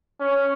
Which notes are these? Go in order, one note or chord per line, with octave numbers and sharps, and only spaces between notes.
C#4